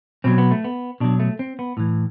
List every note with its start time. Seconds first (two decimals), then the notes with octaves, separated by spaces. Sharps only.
0.24 B2 F#3 C4
0.38 B3
0.51 A3
0.64 B3
1.00 B2 F#3 D4
1.20 A3
1.39 C4
1.59 B3
1.77 A2 E3